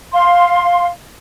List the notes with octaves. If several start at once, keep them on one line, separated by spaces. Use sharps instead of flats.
F5 C6